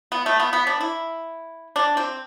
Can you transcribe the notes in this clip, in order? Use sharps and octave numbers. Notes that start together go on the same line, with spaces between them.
B3
A3
B3
B3
D4
E4
D4
C4